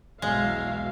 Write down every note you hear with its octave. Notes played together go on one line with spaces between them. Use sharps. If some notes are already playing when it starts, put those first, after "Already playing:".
B1 E2 G#3 F#4 E5 F5